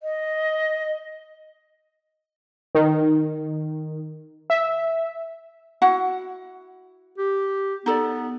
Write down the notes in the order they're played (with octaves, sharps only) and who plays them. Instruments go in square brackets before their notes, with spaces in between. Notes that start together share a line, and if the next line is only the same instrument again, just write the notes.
[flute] D#5
[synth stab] D#3
E5
[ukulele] E4 F#4 F#5
[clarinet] G4
[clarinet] B3 [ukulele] D#4 A4 D5